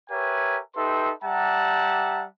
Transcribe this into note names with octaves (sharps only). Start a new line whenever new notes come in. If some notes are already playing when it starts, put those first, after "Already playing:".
G4 A#4 B4 C#5 E5 G#5
D#4 G4 A4 B4 E5 C6
G3 G4 E5 F#5 A5 A#5